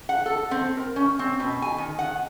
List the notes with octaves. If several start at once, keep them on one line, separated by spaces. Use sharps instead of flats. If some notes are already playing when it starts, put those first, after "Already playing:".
F#5
A4
C4
A#4
C#4
C4
B2
G#5
D#3
F#5